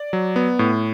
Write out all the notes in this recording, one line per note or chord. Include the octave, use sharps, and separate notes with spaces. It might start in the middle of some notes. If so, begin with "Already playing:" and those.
Already playing: D5
F#3
B3
A2